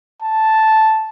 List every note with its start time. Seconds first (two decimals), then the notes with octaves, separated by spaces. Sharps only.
0.22 A5